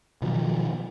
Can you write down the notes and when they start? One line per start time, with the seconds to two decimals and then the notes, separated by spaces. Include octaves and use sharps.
0.22 B2 D#3 F3 F#3